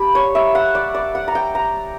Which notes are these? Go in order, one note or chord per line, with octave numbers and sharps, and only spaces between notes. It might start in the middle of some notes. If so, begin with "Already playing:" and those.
Already playing: G3 A#3 D4 B5
C#5
E5
F#5
D5
D5
F#5
A#5
G5
A#5